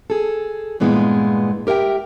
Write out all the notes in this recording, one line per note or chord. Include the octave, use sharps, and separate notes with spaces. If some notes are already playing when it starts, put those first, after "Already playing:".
G#4 A4
G2 A#2 E3 G#3 B3
G4 A#4 E5 F#5 G5